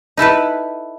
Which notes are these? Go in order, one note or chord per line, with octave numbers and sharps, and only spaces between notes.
D#4 E4 A4 B4